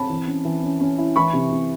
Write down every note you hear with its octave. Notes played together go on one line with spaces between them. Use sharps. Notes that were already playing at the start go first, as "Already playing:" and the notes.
Already playing: C4 A5 B5
E3
C#4
E3
C#4
C#4
E4
E3 B5 C#6
C3
C3